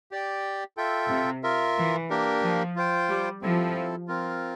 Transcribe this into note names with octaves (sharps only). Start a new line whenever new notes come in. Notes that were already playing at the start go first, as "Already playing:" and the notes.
G4 D5 G5
F4 A4 E5 G5
C3
F4 A#4 E5
E3
A#3 D4 G4 A#4
F3
F4 C5 G5
G3
F3 C4 E4 A4
C4 F4 A#4